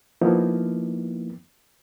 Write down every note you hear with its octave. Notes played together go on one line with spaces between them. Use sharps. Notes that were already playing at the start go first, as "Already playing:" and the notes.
F3 A#3 B3 D#4 E4